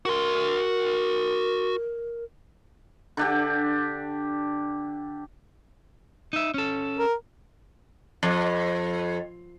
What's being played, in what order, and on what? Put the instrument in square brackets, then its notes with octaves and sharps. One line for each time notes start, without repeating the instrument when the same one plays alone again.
[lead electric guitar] F#4 C6 [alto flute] A#4
[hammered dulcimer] D3 D4 G4
[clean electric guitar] D#4 E5
C#4 A4
[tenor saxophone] A#4
[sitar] F2